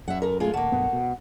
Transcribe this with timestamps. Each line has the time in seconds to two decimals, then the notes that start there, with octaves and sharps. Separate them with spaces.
0.08 F#2 E5 F#5
0.22 A4 A#4
0.40 G#3 A3 F4 G#4
0.54 D#1 A3 A#3 F#5
0.72 B1 G2 B3
0.93 B2